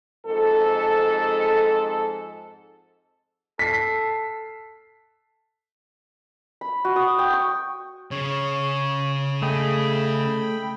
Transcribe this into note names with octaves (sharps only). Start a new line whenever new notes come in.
F2 G#2 A4
A4 B6 C7
B5
F#4
D#6
G5
C#6
C#3 C#5
A3 G#4 D#5 G5 B5